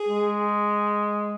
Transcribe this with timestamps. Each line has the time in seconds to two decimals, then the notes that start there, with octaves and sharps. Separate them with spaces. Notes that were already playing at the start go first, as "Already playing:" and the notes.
Already playing: G#4
0.09 G#3